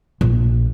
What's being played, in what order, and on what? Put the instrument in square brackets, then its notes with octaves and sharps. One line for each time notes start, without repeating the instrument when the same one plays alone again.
[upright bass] A#1